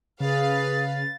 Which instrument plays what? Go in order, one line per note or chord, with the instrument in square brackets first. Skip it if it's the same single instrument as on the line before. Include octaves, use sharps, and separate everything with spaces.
[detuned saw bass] C#3 [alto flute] G#4 [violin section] B4 F5 [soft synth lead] A6